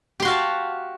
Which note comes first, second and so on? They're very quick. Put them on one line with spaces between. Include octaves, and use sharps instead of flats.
G4 C6 F#4 F5 A5